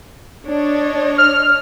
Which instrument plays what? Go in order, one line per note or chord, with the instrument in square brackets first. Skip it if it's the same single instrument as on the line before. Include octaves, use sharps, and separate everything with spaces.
[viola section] D4 C#5 D#5
[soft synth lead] F6